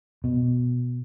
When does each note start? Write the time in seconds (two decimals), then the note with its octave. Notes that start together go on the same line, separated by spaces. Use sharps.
0.24 B2